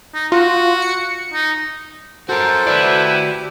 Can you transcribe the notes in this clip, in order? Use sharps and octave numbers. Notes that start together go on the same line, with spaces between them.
D#4
F4 F#4
C#7
D#4
F#4 A4 A#4 C5
E4 F#4 B4 D5
G4